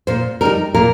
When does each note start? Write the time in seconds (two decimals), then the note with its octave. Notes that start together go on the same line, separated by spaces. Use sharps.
0.07 A#2 C5
0.41 G3 D#4 A#4
0.74 A#2 A#4